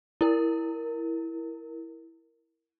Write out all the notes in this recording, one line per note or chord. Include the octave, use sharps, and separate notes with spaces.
E4 A#4